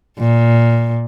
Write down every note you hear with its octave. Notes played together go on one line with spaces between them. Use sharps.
A#2